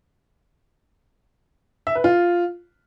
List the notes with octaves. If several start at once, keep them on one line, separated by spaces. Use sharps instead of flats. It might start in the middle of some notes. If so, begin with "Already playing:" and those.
E5
B4
F4